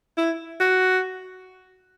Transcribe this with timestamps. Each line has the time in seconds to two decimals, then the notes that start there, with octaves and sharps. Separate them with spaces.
0.17 E4
0.60 F#4